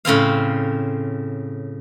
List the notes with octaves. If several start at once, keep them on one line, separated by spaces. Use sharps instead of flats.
A2 C#3 C4 F5